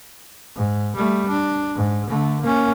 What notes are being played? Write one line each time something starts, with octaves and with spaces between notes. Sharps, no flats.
G#2
G3 A3
D4
G#2
D3 A3
A#3 C#4